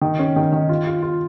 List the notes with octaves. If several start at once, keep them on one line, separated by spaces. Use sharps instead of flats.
D#3
C#4
D#3
D#3
F4
F4
F4